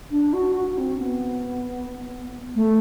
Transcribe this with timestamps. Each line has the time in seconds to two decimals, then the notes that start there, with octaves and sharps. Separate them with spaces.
0.11 D4
0.33 F#4
0.56 F#4
0.78 C4
1.00 B3
2.56 A3